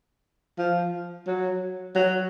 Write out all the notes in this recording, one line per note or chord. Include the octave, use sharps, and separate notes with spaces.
F3
F#3
F#3